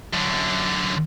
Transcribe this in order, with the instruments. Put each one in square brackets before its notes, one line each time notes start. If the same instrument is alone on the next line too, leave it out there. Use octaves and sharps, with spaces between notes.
[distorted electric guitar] F#2 D3